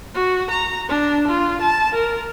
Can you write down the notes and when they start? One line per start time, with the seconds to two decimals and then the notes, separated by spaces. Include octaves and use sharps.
0.15 F#4
0.51 A#5
0.89 D4
1.28 F4
1.62 A5
1.95 A#4